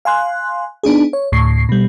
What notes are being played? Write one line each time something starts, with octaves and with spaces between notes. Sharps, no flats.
F5 G#5 C6 F#6
B3 D4 D#4 G#4
C#5
D2 A2 C#6 C7
B2 G3